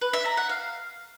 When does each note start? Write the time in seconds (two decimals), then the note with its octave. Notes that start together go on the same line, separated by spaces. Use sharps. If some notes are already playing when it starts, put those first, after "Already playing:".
0.01 B4
0.13 E5
0.25 A#5
0.37 F#5
0.49 F5